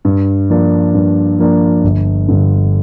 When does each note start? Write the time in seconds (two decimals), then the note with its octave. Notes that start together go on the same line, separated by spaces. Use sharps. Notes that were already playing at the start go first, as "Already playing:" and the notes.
0.05 G2
0.50 F3 A#3 D4
0.94 G2
1.39 F3 A#3 D4
1.84 G1
2.28 G2 D3